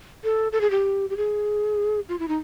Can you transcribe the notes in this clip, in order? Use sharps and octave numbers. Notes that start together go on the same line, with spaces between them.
A4
A4
G#4
G4
G4
G#4
F4
E4
D#4